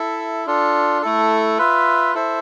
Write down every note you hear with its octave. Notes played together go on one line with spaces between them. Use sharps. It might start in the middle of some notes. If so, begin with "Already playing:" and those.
Already playing: E4 A4 E5
D4 F4 A4
A3 E4 A4
F4 B4 E5
E4 A4 C5 E5